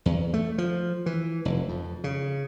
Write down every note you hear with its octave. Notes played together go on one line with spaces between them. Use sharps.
E2
A3
F3
E3
F1
F2
C#3